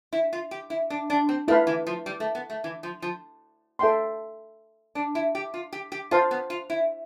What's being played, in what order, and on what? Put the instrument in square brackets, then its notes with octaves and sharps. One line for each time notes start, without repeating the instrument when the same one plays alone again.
[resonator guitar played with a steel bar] E4
F4
G4
E4
D4
D4
C4
[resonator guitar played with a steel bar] A3 [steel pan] E4 B4 F5 B5
[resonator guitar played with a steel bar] E3
F3
G3
A3
B3
A3
E3
F3
F3
[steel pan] A4 E5 G5 C6
[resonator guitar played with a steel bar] D4
E4
G4
F4
G4
G4
[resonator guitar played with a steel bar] F4 [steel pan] C5 F5 A5 C6
[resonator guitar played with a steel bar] B3
F4
E4